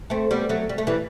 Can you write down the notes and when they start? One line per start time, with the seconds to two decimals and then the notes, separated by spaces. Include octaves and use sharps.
0.10 A3 C4
0.31 G3 B3
0.49 F#3 A3
0.69 G3
0.78 A3
0.87 E3 G3